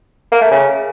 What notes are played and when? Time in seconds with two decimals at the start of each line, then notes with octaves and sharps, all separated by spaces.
0.32 A#3
0.41 A3
0.51 C#3